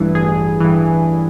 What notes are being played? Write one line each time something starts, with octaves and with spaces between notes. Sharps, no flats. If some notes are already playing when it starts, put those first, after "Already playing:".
Already playing: A1 G2 E3
A1 G#4
G2 E3